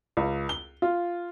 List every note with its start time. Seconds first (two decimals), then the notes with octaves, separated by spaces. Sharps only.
0.17 C#2
0.49 G7
0.82 F4